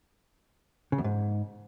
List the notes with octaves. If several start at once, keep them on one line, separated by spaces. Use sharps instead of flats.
C#3
E2
G#2